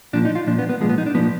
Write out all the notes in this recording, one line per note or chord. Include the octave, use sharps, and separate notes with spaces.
A#2 F3 D4
D#4
F4
A#2 F3 D4
B3
B3
A#2 F3 G#3
B3
D#4
D4
A#2 F3 B3